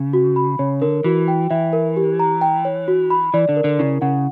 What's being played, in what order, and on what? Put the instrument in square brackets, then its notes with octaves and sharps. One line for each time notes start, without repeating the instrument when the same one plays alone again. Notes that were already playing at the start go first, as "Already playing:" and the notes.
Already playing: [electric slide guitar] C#3
[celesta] F#4
B5
[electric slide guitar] C#3 [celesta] C#5
[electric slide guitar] D3 [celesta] A#4
[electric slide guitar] E3 [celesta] F#4
[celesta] G5
[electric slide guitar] E3 [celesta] E5
[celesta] A#4
G4
A#5
G5
C#5
F#4
B5
[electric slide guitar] E3 [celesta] D5
[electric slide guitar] D3
[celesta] A#4
[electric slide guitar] D3
[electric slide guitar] C#3 [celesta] E4
[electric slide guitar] C#3 [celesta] F#5